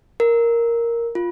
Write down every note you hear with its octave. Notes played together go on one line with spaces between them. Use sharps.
A#4
F4